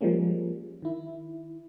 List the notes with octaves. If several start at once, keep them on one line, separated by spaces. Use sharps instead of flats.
F3 G3 G#3 A#3 C#4
D#3 E4